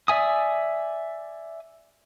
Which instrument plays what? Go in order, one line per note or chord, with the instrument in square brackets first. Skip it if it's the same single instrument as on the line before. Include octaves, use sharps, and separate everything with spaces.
[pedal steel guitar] D5 E5 G#5 D#6